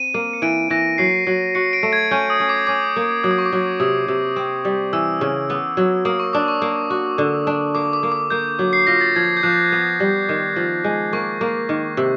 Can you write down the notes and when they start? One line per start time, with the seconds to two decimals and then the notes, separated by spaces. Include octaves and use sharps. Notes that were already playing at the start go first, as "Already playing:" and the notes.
Already playing: C4 D#7
0.14 A#3
0.33 C#7
0.42 E3 D7
0.70 E3 A#6
0.98 F#3 C7
1.27 F#3
1.55 F#4 C#7
1.73 D7
1.83 A3
1.93 G#6
2.11 C#4 G6
2.30 D#6
2.40 C#4
2.49 D6
2.67 C#4 D6
2.96 A#3
3.24 F#3 D#6
3.31 D6
3.38 C#6
3.45 D6
3.53 F#3
3.80 C3 D#6
4.08 C3
4.36 C4
4.65 G3
4.93 E3 E6
5.21 C#3
5.50 B3
5.77 F#3
6.05 A#3 D#6
6.20 C#6
6.33 D4 D6
6.48 C#6
6.62 A#3
6.90 F#4
7.18 D3
7.47 D4
7.75 A#3 D6
7.93 D6
8.03 A#3
8.12 D6
8.30 A#3 G6
8.59 F#3
8.73 C7
8.87 F4 A#6
9.01 A6
9.16 F3 G#6
9.37 G6
9.43 F3 F#6
9.72 B3
10.00 G3
10.29 D#3
10.56 F3
10.84 G#3
11.13 A#3 C#6
11.41 A#3
11.69 D#3
11.97 C3